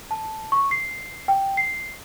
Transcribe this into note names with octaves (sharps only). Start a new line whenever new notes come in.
A5
C#6
C7
G5
C7